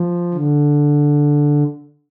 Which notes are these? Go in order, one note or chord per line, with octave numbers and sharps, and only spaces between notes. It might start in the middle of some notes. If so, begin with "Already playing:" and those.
Already playing: F3
D3